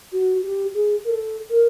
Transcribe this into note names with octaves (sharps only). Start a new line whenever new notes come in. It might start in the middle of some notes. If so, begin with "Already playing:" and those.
F#4
G4
G#4
A#4
A4
A#4